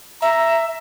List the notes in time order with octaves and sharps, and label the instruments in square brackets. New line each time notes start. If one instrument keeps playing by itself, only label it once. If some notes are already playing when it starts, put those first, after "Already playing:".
[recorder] E5 [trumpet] A#5